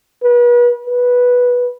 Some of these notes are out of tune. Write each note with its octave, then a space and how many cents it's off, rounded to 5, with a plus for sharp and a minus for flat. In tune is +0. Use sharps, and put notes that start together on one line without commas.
B4 -35
B4 -10